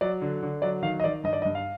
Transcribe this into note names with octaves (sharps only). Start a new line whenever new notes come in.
F#3 D5
D3
D3
F#3 D5
D#3 F5
D#5
D#3 D5
G2 D#5
D5
D#5
G2
F5